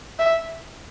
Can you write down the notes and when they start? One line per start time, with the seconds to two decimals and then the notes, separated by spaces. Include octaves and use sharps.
0.19 E5